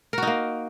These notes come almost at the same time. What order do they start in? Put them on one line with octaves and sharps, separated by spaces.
A#4 F#4 D#4 A#3